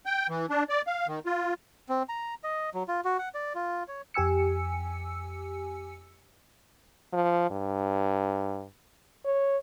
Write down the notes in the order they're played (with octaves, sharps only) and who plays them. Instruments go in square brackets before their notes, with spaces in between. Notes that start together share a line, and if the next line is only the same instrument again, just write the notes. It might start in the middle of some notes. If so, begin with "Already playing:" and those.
[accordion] G5
E3
D4
D5
F5
D#3
F4
[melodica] C4
A#5
D#5
F#3
F4
F#4
F#5
D5
F4
C#5
[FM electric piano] F2 G4 G#5 E6 C#7
[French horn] F3
G2
C#5